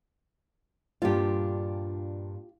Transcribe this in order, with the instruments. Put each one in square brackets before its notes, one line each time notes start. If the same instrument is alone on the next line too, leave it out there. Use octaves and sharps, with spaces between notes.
[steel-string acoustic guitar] G2 A#2 D4 [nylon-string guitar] F4 G4